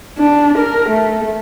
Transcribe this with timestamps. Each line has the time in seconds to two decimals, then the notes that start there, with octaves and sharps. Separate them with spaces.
0.18 D4
0.58 A#4
0.90 A3